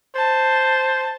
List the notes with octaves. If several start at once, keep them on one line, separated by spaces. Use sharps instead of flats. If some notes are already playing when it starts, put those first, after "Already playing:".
C5 A5